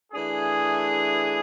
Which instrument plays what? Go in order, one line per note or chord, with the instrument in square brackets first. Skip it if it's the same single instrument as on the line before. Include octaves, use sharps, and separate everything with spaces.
[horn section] E3 A3 D4 G#4